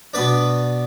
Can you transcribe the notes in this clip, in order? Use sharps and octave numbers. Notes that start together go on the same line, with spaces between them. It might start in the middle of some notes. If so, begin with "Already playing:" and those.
B2 B3 D4 B4